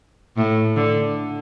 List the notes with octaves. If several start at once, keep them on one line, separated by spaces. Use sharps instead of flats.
A2
D3